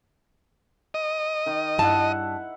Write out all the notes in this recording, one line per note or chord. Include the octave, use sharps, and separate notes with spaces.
D#5
D#3
G2 E4 F#5 A5